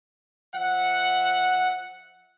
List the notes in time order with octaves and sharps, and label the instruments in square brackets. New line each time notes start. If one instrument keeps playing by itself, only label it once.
[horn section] F3 E5 F#5